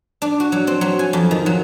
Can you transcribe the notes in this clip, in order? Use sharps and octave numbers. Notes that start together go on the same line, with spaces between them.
D4
F#4
F#3
C4
F#3
G#5
F2
D#3
F#3